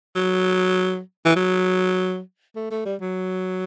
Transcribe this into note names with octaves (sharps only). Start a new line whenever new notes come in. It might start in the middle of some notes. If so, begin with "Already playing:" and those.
F#3
E3
F#3
A3
A3
G3
F#3